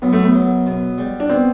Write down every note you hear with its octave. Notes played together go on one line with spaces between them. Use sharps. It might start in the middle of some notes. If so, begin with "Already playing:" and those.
F#2 B3
A3
B3
F#3
B2
G3
D4
B2 C4